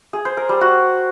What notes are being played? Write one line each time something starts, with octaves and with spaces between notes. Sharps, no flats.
G#4
C5
A#4
G3
F#4